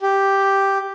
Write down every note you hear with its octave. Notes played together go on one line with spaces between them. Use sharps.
G4